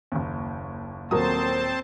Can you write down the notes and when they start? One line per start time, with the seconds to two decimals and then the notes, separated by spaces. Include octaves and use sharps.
0.12 F#1 D#2
1.11 D#1 F#3 A#3 C4 C5 A5 D#6